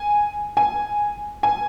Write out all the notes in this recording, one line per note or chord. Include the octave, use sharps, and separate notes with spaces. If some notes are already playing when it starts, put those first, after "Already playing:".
Already playing: G#5
G#5
G#5